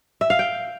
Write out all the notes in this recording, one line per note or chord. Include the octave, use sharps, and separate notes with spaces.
E5
F5
G5